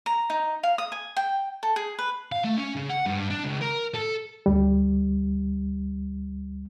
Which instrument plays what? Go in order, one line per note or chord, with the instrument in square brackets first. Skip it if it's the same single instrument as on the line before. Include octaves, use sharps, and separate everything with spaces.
[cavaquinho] A#5
D#4
F5
D#6
G#5
G5
A4
G#4
B4
[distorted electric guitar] F5
A3
C#4
C#3
F#5
G2
D4
C#2
A#4
A4
[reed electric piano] D2 G3